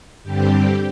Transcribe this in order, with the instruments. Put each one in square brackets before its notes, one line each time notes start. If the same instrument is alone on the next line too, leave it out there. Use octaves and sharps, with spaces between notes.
[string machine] G2 D3 G3 C4 G4